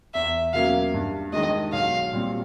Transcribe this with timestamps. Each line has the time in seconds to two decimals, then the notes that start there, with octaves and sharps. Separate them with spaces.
0.14 E2 E5
0.53 B2 F#3 A#3 C#4 F5
0.94 G2
1.33 D#3 G#3 D#5
1.73 B1 F5
2.13 A#2 G3 C4